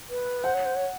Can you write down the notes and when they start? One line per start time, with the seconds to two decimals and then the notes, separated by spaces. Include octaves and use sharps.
0.10 B4
0.44 C5 F#5
0.54 C#5
0.65 C5
0.76 C#5